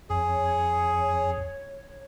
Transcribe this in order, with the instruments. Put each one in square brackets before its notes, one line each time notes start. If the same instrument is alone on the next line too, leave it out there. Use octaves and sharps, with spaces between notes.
[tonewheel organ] F2 [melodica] G#4 [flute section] C#5